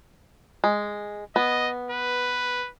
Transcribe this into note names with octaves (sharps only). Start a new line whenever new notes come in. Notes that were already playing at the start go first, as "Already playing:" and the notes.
G#3
B3 D#5
B4